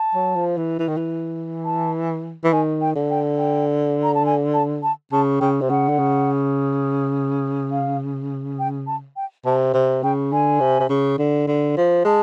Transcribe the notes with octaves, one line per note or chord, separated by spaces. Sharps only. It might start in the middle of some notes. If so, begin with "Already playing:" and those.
Already playing: A5
F#3
F3
E3
E3
D#3
E3
A5
E3
D#3 G#5
G5
D3
G5
G5
A#5
A5
G#5
A5
A5
C#3 A5
C#3 G5
C3
C#3 F#5
D3
C#3
F5
G5
A5
G5
C3 A5
C3
C#3 G5
D3 G#5
C3
C3
C#3
D3
D3
F3
G#3 A5